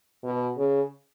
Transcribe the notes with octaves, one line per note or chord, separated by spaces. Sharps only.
B2
C#3